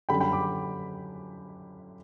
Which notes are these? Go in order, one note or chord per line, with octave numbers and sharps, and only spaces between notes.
F#2 D3 G3 G5 B5
G5 B5
B5 D6